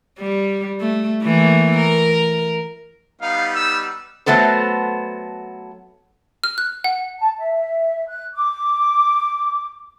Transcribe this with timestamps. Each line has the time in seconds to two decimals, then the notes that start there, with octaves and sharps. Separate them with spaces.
0.19 G3
0.80 A3
1.23 E3 A3 A#3
1.77 A#4
3.22 G3 B3 D#4 F5
3.55 E6
4.26 F#3 A3 B3 A4 C5
6.44 F6
6.58 F#6
6.84 F#5
7.19 A5
7.38 E5
8.07 F#6
8.34 D6